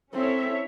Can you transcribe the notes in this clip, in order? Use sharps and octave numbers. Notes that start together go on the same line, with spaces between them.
C4 C#4 E4 A4 C#5 E5